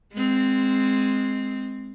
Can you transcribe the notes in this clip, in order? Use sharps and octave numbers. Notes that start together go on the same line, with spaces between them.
G#3 C4